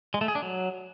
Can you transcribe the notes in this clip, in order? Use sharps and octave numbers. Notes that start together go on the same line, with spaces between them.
G#3
A3
G#4
D4
F#3